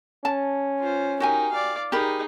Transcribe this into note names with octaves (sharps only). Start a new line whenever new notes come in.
C#4 A5
F4 C5
D#4 F#4 G4 A#4 G#5
D5 F5
D#4 G4 G#4 A#4 B5